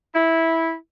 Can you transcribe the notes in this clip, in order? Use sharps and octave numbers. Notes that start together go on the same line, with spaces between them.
E4